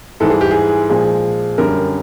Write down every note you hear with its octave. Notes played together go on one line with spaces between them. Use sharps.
G#2 E3 G3 A4
G#4
G4
G#4
A#2 F3 G#3
F#2 D3 G3 A#4